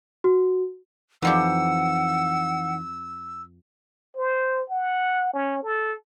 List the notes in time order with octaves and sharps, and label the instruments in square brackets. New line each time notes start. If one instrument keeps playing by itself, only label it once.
[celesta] F#4
[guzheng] F2 F3 G4 [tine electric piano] E3 D#4 [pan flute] F#5 [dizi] E6
[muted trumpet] C5
F#5
C#4
A4